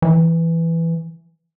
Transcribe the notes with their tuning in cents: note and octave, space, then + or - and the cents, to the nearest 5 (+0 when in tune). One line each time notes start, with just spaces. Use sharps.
E3 +5